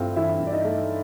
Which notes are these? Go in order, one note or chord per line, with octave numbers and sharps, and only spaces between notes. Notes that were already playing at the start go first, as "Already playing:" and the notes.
Already playing: G2 A3 C4 E4 F4 F5
E3 E4 E5
G2
D5
D#4 D#5
A3